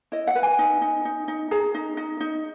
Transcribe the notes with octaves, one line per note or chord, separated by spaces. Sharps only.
E4 D#5
F#5
B4
G#5
D#4
D#4
D#4
D#4
G#4 A#5
D#4
D#4
D#4